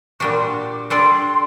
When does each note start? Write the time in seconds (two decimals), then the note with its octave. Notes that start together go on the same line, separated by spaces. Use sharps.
0.20 A#2 G3 D4 F#4 D6
0.32 C6
0.44 D6
0.90 G3 D4 A4 D5 C6